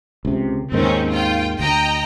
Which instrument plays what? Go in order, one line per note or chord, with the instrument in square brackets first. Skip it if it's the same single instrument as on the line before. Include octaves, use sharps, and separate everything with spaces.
[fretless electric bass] C#2 C3
[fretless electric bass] D#2 G#2 D#3 [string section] C4 C#4
[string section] F4 G5
[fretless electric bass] D2 [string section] D#5 G5 A#5